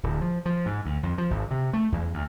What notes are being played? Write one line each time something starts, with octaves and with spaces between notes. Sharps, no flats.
D1
F3
F3
G#2
D2
F2
F3
G#1
C3
A3
E2
D2